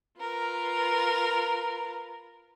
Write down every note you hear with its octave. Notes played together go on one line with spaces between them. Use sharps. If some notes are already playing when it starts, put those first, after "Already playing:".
F4 A#4 B4